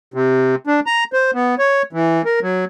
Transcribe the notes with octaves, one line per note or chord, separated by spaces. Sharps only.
C3
D4
A#5
C5
B3
C#5
E3
A#4
F#3